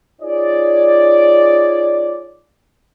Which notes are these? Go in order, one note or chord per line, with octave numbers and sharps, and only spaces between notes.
D#4 F4 G#4 C#5 D5